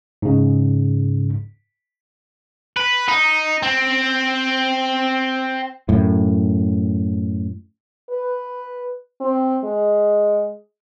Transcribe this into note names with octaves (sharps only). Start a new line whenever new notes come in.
G#2 C#3
B4
D#4
C4
F#2 A2
B4
C4
G#3